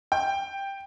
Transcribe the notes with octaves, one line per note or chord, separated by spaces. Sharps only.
G5